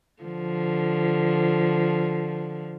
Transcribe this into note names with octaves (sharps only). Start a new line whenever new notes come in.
D3 F3